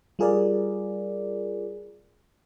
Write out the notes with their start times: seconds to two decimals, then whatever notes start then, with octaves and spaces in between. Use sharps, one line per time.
0.19 G3 F4 G#4 A#4 D5